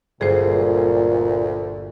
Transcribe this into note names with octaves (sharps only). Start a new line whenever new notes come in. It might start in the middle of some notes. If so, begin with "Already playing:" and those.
G1 D2 A#2 G#4 C5